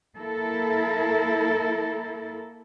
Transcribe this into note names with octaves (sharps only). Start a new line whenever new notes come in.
A#3 E4 A4 A#4